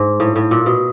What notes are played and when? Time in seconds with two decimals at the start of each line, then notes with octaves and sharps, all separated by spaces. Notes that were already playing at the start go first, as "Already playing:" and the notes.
Already playing: G#2
0.20 A2
0.36 A2
0.51 A#2
0.66 B2